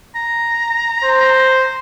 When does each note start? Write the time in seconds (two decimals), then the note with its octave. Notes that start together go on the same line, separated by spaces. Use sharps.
0.15 A#5
1.04 C5